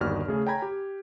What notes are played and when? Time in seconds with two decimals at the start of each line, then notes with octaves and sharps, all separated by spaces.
0.01 G1 D#2 F#4 D5 F6
0.28 C#3 A3 G#4
0.46 C#5 G5 G#5 A#5 B5 G#6
0.62 G4